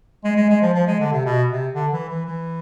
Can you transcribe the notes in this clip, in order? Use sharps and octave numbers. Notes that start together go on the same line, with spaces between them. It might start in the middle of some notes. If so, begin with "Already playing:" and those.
G#3
G#3
G#3
F3
F3
G#3
D3
C3
B2
C3
D3
E3
E3
E3